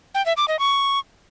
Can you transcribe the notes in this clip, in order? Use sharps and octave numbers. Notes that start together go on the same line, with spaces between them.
G5
E5
D6
D#5
C#6